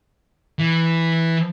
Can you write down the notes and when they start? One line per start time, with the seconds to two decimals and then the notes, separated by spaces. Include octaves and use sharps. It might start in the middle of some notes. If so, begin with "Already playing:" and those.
0.59 E3